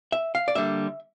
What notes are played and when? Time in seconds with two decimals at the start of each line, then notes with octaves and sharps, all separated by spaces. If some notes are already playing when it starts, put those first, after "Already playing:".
0.12 E5
0.35 F5
0.48 D5
0.55 D3 G3 A#3 E5